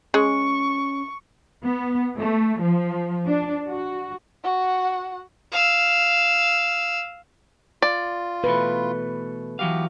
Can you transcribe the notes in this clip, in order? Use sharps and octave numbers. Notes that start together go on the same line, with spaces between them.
G#3 C#4 C#6
B3
A3
F3
D4
F#4
F#4 F#5
F5 E6
F4 D5
B2 E3 A3 B4
E3 F#3 B3 G4 F5